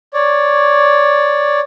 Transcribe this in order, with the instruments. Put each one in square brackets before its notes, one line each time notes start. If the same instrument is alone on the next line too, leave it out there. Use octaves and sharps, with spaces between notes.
[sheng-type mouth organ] C#5 D5